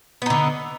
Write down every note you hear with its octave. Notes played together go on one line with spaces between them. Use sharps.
D3 B3 D#4